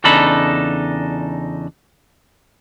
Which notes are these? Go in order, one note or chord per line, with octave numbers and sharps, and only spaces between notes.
E2 C#3 D4 D#4 A4 B5